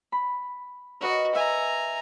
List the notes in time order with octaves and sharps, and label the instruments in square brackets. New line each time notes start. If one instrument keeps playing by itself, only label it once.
[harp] B5
[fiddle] F#4 [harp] A#4 B4 D#5
[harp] E5 [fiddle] G#5 A#5